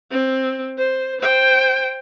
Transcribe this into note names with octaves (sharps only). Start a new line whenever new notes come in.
C4
C5
C5 G5